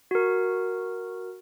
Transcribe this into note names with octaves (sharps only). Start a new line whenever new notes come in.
F#4 A#4